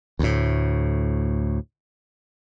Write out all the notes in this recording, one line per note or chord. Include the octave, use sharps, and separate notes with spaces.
D2 A2